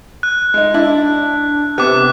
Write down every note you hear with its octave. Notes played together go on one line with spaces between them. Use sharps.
F#6
G#3 D#4
D4 E4
C3 B3 D6 F#6